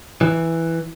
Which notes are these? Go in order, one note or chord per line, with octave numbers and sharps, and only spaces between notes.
E3